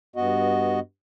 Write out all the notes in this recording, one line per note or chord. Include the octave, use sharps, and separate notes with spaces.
G2 B3 F#4 D#5